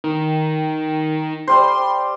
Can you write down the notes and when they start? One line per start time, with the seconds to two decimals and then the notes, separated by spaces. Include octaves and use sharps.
0.04 D#3
1.48 G3 C5 C6